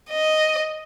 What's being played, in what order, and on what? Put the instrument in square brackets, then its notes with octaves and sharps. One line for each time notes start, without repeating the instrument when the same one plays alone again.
[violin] D#5